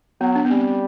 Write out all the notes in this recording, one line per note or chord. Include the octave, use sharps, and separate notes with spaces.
F#3 B3
D4
B3
G3 C4